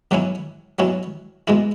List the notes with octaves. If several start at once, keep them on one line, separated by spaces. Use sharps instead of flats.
B2 F#3 C#4 E4
B2 F#3 C#4 E4
B2 G#3 E4